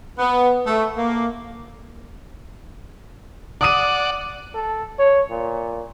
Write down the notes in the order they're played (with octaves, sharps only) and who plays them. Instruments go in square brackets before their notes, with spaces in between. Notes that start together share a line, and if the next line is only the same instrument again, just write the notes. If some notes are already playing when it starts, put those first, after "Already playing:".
[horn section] B3
A3
A#3
[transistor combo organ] D5 F#5 [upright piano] D6 D#6 D#7
[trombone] A4
C#5
A#2